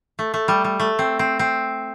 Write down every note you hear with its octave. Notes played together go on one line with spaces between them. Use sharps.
A3
A3
G3
G3
A3
C4
C4
C4